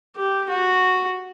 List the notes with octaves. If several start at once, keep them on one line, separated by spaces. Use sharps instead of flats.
G4
F#4